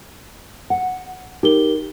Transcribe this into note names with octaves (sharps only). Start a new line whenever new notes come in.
F#5
D#4 G4 A#4 G7